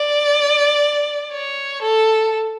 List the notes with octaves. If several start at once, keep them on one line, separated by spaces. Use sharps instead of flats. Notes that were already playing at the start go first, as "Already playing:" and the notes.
Already playing: D5
C#5
A4